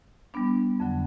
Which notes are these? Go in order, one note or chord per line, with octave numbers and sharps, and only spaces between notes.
G3 B3 D4
F2 D3 F#3